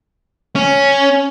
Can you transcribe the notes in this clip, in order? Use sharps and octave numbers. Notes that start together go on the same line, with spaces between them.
C#4